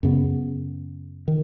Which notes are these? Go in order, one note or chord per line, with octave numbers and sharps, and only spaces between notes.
F#2 C#3 B3
D#3